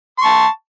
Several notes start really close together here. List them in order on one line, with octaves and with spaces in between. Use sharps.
C6 C#6 A5